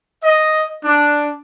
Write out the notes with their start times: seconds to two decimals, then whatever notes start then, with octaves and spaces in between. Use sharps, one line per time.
0.23 D#5
0.83 D4